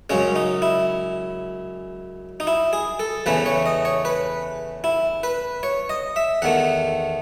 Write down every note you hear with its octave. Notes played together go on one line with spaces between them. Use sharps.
F#2 C#3 G#3 C#4
D#4
E4
D#4
E4
G#4
A4
E2 C#3 E3 A3 B4
C#5
D#5
C#5
B4
E4
B4
C#5
D#5
E5
E2 D#3 A3 F#5